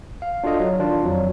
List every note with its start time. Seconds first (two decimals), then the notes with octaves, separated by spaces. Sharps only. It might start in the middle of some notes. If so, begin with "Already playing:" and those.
0.22 F5
0.44 D4 F4 F#4 A4 D#5 F5
0.60 F#3
0.79 D#3 D4 F4
1.03 F2 F#3